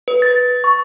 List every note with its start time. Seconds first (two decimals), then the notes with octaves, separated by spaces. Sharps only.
0.08 B4
0.22 A6
0.64 C#6